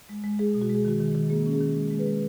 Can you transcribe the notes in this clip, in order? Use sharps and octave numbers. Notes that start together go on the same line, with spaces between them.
G#3
G#3
G#3 G#4
B2
F#4
G#3
G#4
D#3 F#4
D#3
D#3
A#3 G#4
C#4
G#4
D#3
G#3
G#3
G#4 B4
G#3